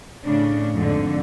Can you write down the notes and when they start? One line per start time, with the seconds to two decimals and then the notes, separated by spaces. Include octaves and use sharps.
0.23 A2 C#3 D4
0.72 F2 G#2 D3